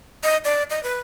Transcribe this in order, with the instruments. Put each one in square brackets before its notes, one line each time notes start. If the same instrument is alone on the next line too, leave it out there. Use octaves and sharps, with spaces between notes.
[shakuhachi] D#5
D5
D#5
B4